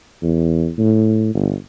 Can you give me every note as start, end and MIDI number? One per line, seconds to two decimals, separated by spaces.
0.22 0.69 40
0.78 1.31 45
1.35 1.55 31